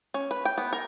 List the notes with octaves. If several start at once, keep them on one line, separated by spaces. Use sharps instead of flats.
C#4
B4
G5
B3
A#4